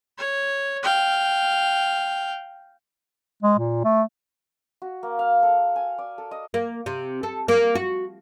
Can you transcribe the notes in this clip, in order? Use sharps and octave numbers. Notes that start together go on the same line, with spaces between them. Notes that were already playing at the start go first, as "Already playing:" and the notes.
C#5
F5 G5
G#3
A#2
A3
F#4
A#3
F5
A4
G#5
D5
A4
D#5
A#3
C3
A4
A#3
F#4